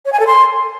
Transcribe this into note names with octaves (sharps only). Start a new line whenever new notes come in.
C#5
G#5
A4
C6